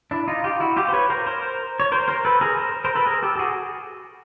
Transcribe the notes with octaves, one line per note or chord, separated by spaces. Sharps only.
D4 E4
D#4 F4
F4 G4
E4 F#4
F4 G4
C5
B4 C#5
A#4 C5
A#4 C5
C#5
A#4 C5
A#4 C5
A4 B4
G#4 A#4
A#4 C5
A#4 C5
A4 B4
G#4 A#4
G4 A4
A4
F#4 G#4